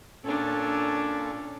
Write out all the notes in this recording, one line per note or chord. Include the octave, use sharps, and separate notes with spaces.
A#2 C#4 D4 A4